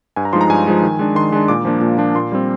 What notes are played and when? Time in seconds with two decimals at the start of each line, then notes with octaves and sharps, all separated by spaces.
0.16 G2 G#5
0.25 A#5
0.33 F3 G#3 D#4 C6
0.41 A#5
0.49 G2 G#5
0.65 F3 G#3 D#4
0.82 D#3
0.99 G#3 D4
1.15 D#3 C6
1.32 G#3 D4
1.48 A#2 D6
1.65 F3 A#3 D4
1.81 A#2
1.98 F3 A#3 D4
2.15 A#2 C6
2.32 G3 C4